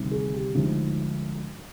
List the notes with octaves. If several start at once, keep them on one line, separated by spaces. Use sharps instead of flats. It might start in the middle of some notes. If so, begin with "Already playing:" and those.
Already playing: D2 C3 D#3 G3
G#4
G4
D2 D3 F3 G#3 D#4